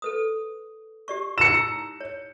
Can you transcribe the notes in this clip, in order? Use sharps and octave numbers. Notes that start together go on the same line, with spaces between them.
A4 B4 D#6
G4 D5 C#6
D#4 A5 E6 C#7 E7
E4 E6
C#5